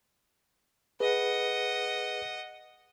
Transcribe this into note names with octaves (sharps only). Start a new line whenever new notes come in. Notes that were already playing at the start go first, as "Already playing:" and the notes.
G#4 B4 D#5 F#5